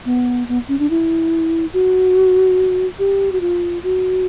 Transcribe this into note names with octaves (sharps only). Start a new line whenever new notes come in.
B3
B3
C#4
D4
E4
F#4
G4
F#4
F4
F#4